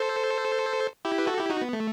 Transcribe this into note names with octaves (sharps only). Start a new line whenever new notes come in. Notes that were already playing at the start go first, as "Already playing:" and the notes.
Already playing: A4 C5
E4 G4
B4
F#4 A4
E4 G4
D#4 F#4
B3
A3